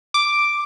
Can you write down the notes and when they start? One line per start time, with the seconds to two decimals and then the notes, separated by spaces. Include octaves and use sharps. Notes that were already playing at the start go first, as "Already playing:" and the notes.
0.14 D6